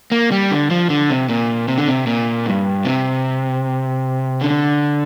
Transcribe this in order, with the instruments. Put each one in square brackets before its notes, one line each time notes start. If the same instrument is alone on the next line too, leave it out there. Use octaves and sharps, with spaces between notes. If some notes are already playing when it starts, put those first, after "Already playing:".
[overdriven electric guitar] A#3
G3
D3
F3
D3
C3
A#2
C3
D3
C3
A#2
G2
C3
D3